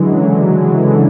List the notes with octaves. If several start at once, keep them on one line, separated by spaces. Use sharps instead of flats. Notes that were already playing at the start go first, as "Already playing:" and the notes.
Already playing: D3 E3 F#3 G#3
C#3 E3
D3 F#3
G#3
F#3
E3 G#3
D3 F#3